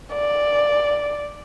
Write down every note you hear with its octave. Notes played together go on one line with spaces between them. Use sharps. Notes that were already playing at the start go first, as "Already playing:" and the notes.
D5